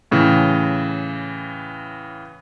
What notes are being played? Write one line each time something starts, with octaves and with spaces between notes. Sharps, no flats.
A2 C#3 E3